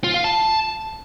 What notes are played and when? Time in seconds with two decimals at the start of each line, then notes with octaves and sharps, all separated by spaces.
0.04 F4
0.14 F5
0.24 A5